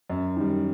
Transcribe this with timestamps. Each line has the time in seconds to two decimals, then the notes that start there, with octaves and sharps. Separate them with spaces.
0.10 F#2
0.36 D#3 G3